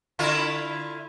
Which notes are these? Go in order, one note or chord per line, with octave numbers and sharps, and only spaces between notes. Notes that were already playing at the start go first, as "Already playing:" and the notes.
D3 E4 F4